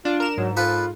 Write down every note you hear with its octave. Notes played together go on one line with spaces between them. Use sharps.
D4 F4
A#4 E7
G#2 F#3
F3 F4 A4 B4